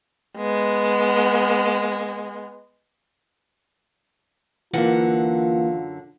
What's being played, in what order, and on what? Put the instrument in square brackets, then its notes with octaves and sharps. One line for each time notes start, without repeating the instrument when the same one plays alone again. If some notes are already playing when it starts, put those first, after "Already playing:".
[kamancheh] G#3 B3
[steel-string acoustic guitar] F#2 D3 F#5 [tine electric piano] E3 A#3 [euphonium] F4